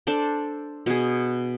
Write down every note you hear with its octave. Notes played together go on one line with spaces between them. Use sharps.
D4 A4 C5 D5
B2 G#4